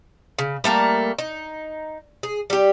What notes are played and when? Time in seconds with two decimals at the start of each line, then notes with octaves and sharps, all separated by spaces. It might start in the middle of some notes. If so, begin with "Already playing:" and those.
0.39 C#3
0.64 G3 A3 A#3 A#5
1.19 D#4
2.23 G#4
2.50 G3 G4